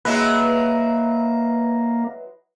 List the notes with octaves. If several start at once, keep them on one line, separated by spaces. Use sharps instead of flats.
F#3 G#3 A#3 E4 B4